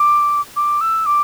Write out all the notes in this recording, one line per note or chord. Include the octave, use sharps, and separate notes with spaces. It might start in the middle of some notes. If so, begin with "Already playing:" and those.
Already playing: D6
D6
E6
D6